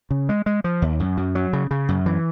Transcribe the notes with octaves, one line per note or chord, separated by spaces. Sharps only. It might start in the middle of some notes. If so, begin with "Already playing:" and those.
C#3
G#3
G#3
F3
D#2
F#2
F#2
F#3
C#3
C#3
F#2
E3